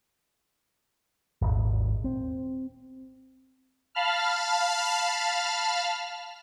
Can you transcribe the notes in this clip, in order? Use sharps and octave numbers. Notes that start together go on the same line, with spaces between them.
D#1 G#1
C4
F5 A5 B5 F6